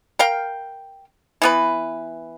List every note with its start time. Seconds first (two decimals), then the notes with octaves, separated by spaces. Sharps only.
0.19 A#4 F5 G5
1.42 E3 B3 B4